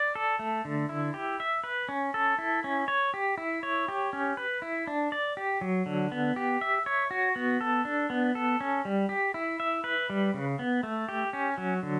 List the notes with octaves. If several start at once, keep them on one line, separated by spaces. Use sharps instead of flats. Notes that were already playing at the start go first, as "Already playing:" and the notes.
Already playing: D5
A4
A3
D3
E4
G4
E5
B4
C#4
A4
E4
C#4
C#5
G4
E4
C#5
G4
C#4
B4
E4
D4
D5
G4
F#3
D3
B3
G4
E5
C#5
F#4
B3
A4
D4
B3
A4
C#4
G3
G4
E4
E5
B4
G3
C#3
B3
A3
G4
C#4
F#3
D3